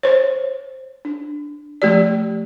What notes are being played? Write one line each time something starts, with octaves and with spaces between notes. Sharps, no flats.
C5 C#5
D4
F3 A3 G4 D5